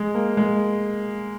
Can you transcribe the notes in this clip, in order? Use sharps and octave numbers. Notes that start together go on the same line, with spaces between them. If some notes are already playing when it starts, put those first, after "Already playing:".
Already playing: G#3
A#3
G#3